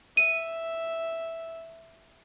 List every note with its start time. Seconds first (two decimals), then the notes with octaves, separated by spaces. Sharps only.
0.17 E5 D#7